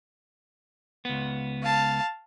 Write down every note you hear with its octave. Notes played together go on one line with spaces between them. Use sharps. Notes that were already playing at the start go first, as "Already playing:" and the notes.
C#2 B3
F5 A5